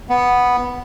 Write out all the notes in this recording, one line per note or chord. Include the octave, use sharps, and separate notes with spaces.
B3